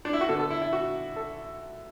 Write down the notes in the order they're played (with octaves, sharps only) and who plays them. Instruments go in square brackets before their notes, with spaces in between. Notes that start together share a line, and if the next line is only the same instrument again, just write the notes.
[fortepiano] D4
E4
F#4
D3 A4
B3
A4
E4
E4
F#4
A4